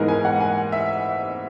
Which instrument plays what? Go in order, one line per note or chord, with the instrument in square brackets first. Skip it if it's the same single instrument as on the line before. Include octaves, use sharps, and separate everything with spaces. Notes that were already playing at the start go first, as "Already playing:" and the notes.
Already playing: [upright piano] G#2 E3 B3 D#4 G#4 A#4
G#5
F#5
G#5
E5